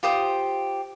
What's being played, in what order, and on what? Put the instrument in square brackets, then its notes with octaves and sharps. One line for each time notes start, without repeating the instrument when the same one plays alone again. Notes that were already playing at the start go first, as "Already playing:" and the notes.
[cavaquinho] F4 G4 C5 D#6